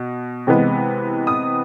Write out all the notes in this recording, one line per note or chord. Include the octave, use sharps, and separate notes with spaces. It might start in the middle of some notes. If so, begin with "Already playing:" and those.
Already playing: B2
C3 E3 G#3 B3
D#6